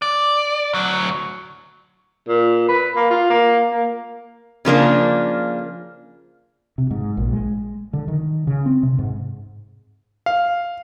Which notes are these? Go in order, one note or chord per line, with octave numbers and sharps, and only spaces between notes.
D5
D2 F#3
A#2
B4
A#3
F4
A#3
A#3
C#3 F3 A#3 D4
C3
G#2
A#1
G#3
D3
D#3
C#3
C4
C3
G#2
F5